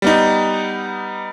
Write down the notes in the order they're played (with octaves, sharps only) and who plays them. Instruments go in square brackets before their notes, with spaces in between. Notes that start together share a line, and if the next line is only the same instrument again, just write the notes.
[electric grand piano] G3 B3 D#4